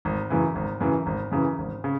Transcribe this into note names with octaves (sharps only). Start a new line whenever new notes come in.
G#1
F#2 C#3 E3
G#1
F#2 C#3 E3
G#1
F#2 C#3 E3
G#1
C#3